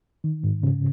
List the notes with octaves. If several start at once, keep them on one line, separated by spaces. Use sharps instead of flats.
D#3
G#2
C#3